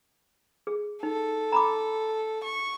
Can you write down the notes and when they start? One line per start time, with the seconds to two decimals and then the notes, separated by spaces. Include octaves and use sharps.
0.67 G#4
1.03 D#4 A4
1.52 A#5 B5 D6
2.44 C#6